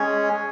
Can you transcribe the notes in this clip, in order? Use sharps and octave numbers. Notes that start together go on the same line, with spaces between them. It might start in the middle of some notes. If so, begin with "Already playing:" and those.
Already playing: G#3 C#4 G#4 C#5